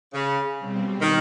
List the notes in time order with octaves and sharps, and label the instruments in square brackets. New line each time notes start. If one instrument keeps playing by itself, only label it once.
[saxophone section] C#3
[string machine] B2 G3 C4
[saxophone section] D#3